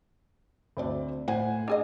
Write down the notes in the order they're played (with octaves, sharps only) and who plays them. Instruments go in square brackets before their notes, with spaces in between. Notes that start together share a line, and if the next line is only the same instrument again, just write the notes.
[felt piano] D2 C4 D5
[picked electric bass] A2 [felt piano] C5 F#5 G#5
[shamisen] D4 G#4 D#5